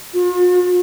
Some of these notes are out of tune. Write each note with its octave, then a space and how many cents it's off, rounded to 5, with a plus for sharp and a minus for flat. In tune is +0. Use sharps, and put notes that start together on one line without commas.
F4 +45